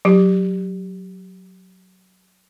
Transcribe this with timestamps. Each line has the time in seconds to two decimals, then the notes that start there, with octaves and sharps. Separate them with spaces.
0.05 F#3 G4